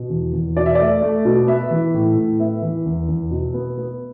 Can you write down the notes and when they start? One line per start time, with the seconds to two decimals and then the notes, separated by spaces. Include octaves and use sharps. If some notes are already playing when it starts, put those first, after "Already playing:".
Already playing: B2
0.10 E2
0.33 E2
0.56 B2 D5
0.66 E5
0.75 A3 D5
1.02 A3
1.25 B2
1.47 B3 E5
1.71 E3
1.94 A2
2.16 A2
2.40 B3 E5
2.62 E3
2.86 E2
3.08 E2
3.31 B2
3.54 B3
3.78 B3